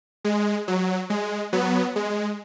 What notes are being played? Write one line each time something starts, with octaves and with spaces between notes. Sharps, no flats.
G#3
F#3
G#3
F#3 B3
G#3